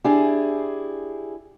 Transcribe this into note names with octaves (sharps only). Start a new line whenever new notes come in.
D4 E4 G4 G#4